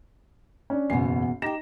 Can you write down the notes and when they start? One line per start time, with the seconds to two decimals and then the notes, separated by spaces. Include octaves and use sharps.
0.70 C#4 D4
0.90 F#1 E2 B2 G#5 C7
1.42 D#4 G4 G5 A#6 E7